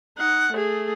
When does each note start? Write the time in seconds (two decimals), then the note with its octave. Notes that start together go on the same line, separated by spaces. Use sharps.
0.18 D#4 F#5
0.53 A3 G#4